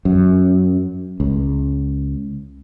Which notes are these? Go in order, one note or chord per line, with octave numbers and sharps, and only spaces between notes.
F#2
C#2